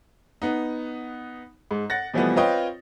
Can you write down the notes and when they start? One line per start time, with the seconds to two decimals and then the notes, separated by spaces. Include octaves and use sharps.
0.42 B3 D#4
1.71 G#2
1.90 F#5 A6 A#6
2.14 B2 E3 F3 G3 A3 B3
2.36 C4 F4 B4 C#5 D#5 G5